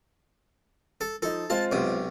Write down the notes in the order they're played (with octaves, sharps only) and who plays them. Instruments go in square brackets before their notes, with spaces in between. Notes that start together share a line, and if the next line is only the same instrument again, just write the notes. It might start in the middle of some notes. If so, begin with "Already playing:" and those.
[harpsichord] A4
[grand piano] F3 D#4 [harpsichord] A4
[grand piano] G#3 C4 F4 [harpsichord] A5
[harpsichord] B1 C3